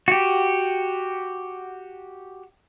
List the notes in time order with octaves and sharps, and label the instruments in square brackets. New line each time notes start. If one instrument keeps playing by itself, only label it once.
[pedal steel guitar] F#4 G4